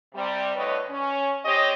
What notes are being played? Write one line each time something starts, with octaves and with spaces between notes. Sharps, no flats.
C3 G3
A2 D3 B4 C#5 D#5
C#4
C4 G4 C#5 D#5